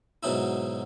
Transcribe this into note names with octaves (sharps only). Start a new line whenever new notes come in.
G#2 B2 F#3 D#4 E4